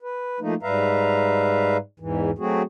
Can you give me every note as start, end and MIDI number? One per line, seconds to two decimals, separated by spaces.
0.02 0.39 71
0.40 0.54 53
0.40 0.54 57
0.40 0.54 58
0.40 0.54 63
0.63 1.77 44
0.63 1.77 55
0.63 1.77 71
0.63 1.77 76
0.63 1.77 77
0.63 1.77 82
2.00 2.31 40
2.00 2.31 44
2.00 2.31 52
2.38 2.62 54
2.38 2.62 57
2.38 2.62 60
2.38 2.62 66
2.38 2.62 68